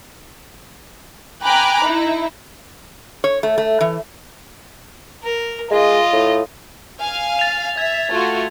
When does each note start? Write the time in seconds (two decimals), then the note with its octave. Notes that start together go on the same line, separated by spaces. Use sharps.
1.44 G5 G#5 A#5 B5 D6 F#6
1.83 D#4 E4
3.24 C#5
3.43 A3
3.58 A3
3.81 E3
5.24 A#4
5.71 G#3 F4 D#5
6.13 A2
7.00 F5 G#5
7.39 A6 F7
7.78 E5 G#6
8.09 A3 F4 F#4